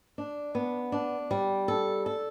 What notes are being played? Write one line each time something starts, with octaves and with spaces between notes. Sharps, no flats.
D4
B3
D4
G3
A4
A4